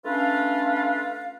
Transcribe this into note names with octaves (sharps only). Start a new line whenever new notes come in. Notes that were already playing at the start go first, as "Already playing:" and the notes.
A3 C#4 D4 F4 B4 F5